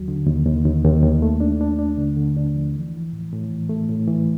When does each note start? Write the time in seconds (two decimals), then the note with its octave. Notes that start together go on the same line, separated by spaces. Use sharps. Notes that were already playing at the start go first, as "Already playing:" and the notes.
Already playing: D#2 F#3
0.08 D3
0.26 D#2
0.46 D#2
0.65 D#2
0.84 D#2
1.03 D#2
1.22 A3
1.40 D4
1.61 D4
1.79 D4
1.98 D3
2.17 D3
2.36 D4
2.55 F3
2.74 E3
2.94 E3
3.13 A2
3.32 A2
3.50 E3
3.69 A3
3.89 A2
4.07 E3